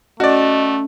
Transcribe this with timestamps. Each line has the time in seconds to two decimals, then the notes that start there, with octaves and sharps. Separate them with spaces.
0.20 A3 C#4 F#4 D5 D#5 F6